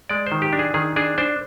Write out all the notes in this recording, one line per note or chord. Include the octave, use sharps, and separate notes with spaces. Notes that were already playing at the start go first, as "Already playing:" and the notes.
G#3 D5
C5
D#3
G4
D4
G#4
D#3 G#4
D4 G#4
D4 C5